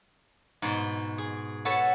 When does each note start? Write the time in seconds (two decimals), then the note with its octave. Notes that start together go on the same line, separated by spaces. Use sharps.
0.62 G#2 B2 C6
1.18 G#4
1.65 F#4 A4 B4 C#5 A5